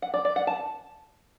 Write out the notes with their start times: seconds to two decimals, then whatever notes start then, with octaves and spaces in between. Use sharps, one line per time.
0.02 F#5
0.14 D5
0.25 D5
0.36 F#5
0.47 A5